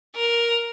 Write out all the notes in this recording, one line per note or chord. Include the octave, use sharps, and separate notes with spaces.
A#4